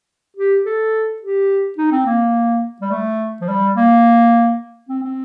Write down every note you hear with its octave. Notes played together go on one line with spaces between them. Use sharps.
G4
A4
G4
D#4
C4
A#3
G3
A3
F3
G3
A#3
C4
C4